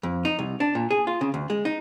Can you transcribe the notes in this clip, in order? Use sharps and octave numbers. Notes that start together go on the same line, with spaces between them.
F2
D#4
C2
D4
A#2
G#4
F4
C#3
D2
G#3
D#4